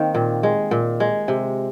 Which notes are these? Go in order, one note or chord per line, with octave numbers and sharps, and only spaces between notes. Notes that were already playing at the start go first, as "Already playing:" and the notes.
Already playing: D#3 A#3 C4
A#2
G#3
A#2
G#3
C3